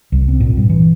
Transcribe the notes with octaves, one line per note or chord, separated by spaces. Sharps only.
C2
C4
A#2
G2
E3